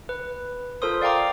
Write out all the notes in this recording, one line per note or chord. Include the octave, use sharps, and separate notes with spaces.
B4
F4 A4 A#4 C5 C6 D#6
D5 F5 G5 A#5 D6